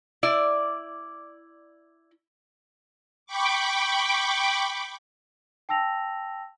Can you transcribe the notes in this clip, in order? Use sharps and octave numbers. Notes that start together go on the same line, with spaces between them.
E4 D5
G5 B5 C#6 D6
G5 A5 E6 A#6 F7